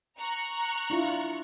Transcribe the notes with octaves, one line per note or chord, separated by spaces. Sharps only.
A#5 C#6 F#6
D4 E4 F4